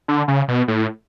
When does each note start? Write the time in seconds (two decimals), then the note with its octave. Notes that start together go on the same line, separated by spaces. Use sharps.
0.08 D3
0.28 C#3
0.48 B2
0.68 A2